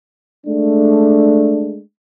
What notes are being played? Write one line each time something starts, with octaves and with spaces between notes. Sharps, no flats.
G#3 A3 D4